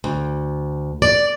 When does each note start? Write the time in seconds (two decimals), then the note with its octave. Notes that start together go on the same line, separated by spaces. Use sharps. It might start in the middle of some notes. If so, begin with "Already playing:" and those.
0.04 D2
1.02 D5